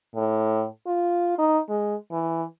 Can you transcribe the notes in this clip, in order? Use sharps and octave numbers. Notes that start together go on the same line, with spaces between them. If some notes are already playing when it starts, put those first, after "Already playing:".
A2
F4
D#4
G#3
E3